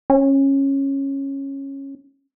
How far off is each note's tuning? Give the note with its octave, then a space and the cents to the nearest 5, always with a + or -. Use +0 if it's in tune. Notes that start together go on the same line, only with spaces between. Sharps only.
C#4 -15